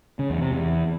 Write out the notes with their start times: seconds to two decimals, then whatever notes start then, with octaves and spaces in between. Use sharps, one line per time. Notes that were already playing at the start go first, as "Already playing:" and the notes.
0.19 C#3
0.30 E2
0.41 C3
0.52 E2